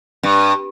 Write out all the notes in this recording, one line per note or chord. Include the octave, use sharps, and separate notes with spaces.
G2